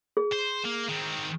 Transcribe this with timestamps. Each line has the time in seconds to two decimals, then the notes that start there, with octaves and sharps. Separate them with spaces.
0.17 G#4
0.32 C5
0.65 A#3
0.89 D#3 C4